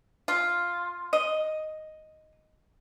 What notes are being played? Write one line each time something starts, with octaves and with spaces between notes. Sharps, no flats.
F4
D#5